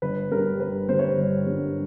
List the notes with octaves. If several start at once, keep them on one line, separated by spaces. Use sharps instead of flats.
G1 B4
G2 D3 G3 A#4
G1 B4
G2 D3 G3 C5
C#5
C5
G1
G2 D3 G3